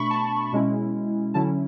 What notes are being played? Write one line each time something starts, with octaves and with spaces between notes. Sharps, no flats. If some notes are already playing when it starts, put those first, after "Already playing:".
Already playing: B2 A3 D4 B5 C#6
A5
B2 G#3 C#4 E4
D3 F#3 C#4 E4 A5